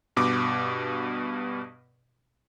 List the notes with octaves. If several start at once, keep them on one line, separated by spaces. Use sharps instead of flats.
G2 B2 D6